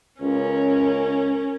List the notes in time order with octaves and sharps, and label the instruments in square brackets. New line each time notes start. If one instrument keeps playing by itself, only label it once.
[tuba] C#2 [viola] C#4 A#4